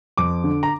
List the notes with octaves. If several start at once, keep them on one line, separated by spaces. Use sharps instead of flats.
F2 D6
D3
A#5